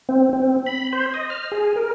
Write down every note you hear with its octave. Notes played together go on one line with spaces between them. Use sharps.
C4
C4
B5
C5
D#5
F6
G#4
A#4